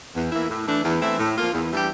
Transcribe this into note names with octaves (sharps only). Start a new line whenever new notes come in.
E2
E3 A#3 E4
A2
E3 A3 D4
E2
E3 A3 C4 E4
A2
F3 A#3 F4
E2
E3 G3 D4 G4